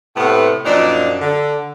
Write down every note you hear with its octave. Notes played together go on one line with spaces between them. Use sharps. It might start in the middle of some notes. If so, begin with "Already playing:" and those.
A2 C3 B3
F#2 A#2 F3 D4 D#4 D5
D3